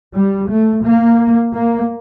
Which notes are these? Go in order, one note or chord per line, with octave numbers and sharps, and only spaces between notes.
G3
A3
A#3
A#3